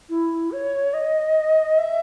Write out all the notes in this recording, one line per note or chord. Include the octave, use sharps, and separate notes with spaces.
E4
C#5
D#5
E5